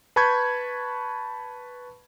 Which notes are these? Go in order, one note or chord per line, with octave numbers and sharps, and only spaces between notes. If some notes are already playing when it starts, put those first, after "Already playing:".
B4 A5 B5 C#6 G6 G#6